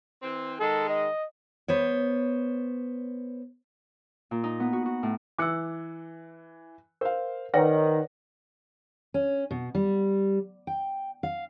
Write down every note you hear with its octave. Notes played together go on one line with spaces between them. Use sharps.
E3 C4
D#3 G#3 A4
D#5
B3 C5 C#5
A#2
D#4
B3
F#4
F#4
A2
E3 D6 E6 F#6 C#7
A#4 C5 F5
D#3 B4 C#5 D5 F#5 G5 A#6
C#4
B2
G3
G5
F5